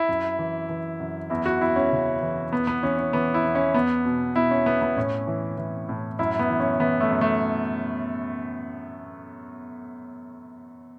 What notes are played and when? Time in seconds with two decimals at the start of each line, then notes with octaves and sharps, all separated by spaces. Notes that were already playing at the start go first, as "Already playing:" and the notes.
Already playing: E4
0.08 F#2
0.39 E3
0.69 E3
1.00 F#2
1.30 E2 E4
1.46 F#4
1.61 E2 E4
1.76 C#4
1.92 C#3
2.22 E3
2.53 E2 B3
2.67 B3
2.83 E3 C#4
2.98 C#4
3.13 E3 B3
3.34 E4
3.44 E2
3.55 C#4
3.74 E2 B3
4.05 B2
4.36 B2 E4
4.51 C#4
4.66 E2 B3
4.82 B3
4.96 A2 C#4
5.27 E3
5.57 E3
5.89 A2
6.19 F#2 E4
6.39 B3
6.50 E3
6.60 C#4
6.80 E3 B3
7.00 A3
7.11 F#2
7.21 A3